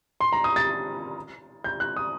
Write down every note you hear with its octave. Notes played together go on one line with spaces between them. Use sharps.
C6
A#5
D#6
A6
G6
F#6
D#6